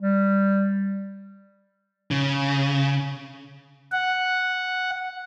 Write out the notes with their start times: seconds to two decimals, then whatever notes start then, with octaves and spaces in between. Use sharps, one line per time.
0.01 G3
2.11 C#3
3.92 F#5